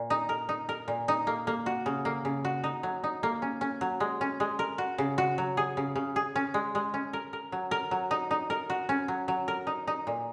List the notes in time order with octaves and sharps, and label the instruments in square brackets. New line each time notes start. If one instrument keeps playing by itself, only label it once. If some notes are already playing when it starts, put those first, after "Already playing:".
Already playing: [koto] A#2
D#4
A#4
D#4
A#4
A#2
D#4
A#3
A#3
F#4
C#3
A#3
C#3
F#4
D#4
F#3
D#4
A#3
C#4
C#4
F#3
G#3
C#4
G#3
A#4
F#4
C#3
F#4
F#3
G#4
C#3
C#3
G#4
C#4
G#3
G#3
C#4
A#4
A#4
F#3
A#4
F#3
D#4
D#4
A#4
F#4
C#4
F#3
F#3
A#4
D#4
D#4
A#2